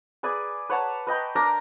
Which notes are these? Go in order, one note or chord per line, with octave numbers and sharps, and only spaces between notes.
G#4 B4 D5 G#5
B4 C#5 F#5 A5
B4 D#5 G5 B5
D4 A#4 D5 A#5